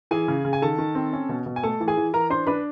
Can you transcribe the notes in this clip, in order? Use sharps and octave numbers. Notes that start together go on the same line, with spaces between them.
E3 G#4 G#5
C#3
C#3
G#5
D#3 A4 A5
D#3
C4
C#4
B2
B2
G#5
A3 A4 A5
E3
G#4 G#5
E3
E3 A#4 A#5
D4 C5 C6
D4 B4 B5